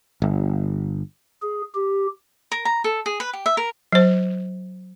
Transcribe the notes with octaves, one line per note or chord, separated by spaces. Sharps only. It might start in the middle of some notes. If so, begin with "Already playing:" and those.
G1
G#4
G4
A#4
A#5
A4
G#4
B4
G4
E5
A#4
F#3 C5